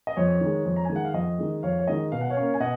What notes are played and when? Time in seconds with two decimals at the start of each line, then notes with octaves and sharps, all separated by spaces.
0.07 D#5
0.16 F2 C#5
0.41 D#3 G#3
0.65 F2
0.76 A#5
0.85 G#5
0.90 D#3 G#3
0.96 F#5
1.05 F5
1.14 F2 D#5
1.38 D#3 G#3
1.63 F2 C#5 F5
1.79 C#5
1.87 D#3 G#3 D#5
2.12 B2 F5
2.21 F#5
2.30 C#5 F5
2.37 A#3 C#4
2.54 G#5
2.60 B2 D#5 F#5